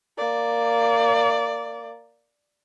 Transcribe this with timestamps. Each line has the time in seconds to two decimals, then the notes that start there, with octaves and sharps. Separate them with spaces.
0.18 A#3 D5